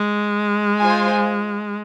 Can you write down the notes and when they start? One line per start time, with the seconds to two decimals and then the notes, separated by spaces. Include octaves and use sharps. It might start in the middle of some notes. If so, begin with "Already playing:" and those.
Already playing: G#3
0.78 F4 C5 G#5